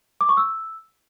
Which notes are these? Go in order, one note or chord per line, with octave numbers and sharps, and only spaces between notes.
D6
C#6
E6